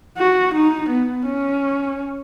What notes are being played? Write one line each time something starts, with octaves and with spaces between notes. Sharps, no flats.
F#4
D#4
B3
C#4